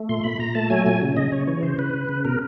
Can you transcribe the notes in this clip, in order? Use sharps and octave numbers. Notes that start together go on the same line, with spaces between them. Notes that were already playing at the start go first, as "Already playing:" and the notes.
Already playing: A3
A#2 C6
A#2 B5
A#2 A#5
A3 A5
F#3 G#5
A#2 G#5
C#3
C#3 D#5
C#3 C#5
E3 C#5
C#3 C5
C#3 B4
C#3
C#3
B2 A#4